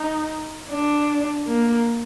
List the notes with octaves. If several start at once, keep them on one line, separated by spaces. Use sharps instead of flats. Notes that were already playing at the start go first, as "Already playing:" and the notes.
Already playing: D#4
D4
A#3